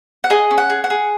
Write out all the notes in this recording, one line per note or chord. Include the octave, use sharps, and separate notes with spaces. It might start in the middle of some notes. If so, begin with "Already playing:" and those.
F#5
G#4 D#5
C#4
F#5
G#4
F#5
G#4